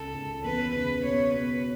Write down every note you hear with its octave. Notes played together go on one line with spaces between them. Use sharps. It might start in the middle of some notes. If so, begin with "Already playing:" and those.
Already playing: C#2 A4
C#2
E2 B4
C#3 B4
B2 C#5
B2 B4